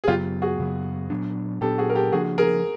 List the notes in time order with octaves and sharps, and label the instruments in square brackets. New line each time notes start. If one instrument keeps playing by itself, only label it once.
[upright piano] G#4
[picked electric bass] F#2 C#3 F#3 B3 [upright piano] F4 G4
[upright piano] F#4 G#4
[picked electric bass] F#2 C#3 F#3 B3
A#2 F#3 B3 D4
[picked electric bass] A#2 F#3 B3 D4 [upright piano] G4 A4
[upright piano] F#4 G#4
A#4
G4 A4
[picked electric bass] C#3 F3 A#3 D4 [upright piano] F#4 G#4
[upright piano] G#4 A#4